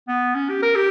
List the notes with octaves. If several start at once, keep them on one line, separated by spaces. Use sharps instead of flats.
B3
C#4
G4
A#4
G4